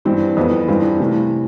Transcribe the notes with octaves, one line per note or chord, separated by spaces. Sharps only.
G2 E3 G3 C4
F2 E3 B3 F4
G2 E3 G3 C4 F4
C3 E3 A3